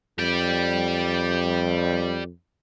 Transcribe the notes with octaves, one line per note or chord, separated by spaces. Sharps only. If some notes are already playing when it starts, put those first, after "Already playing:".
F2 G4 D5